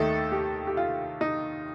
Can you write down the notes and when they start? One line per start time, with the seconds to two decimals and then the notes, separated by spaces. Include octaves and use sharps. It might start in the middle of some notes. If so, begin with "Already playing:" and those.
Already playing: D#2 D#3 A3 D#4 A4
0.32 G4
0.67 G4
0.77 F4
1.21 D#4